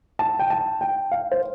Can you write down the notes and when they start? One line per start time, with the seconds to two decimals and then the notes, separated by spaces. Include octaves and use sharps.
0.19 A5
0.39 G5
0.50 A5
0.81 G5
1.12 F5
1.32 C5